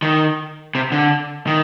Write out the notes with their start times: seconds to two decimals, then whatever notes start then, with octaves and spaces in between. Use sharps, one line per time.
0.02 D#3
0.75 C3
0.92 D3
1.47 D#3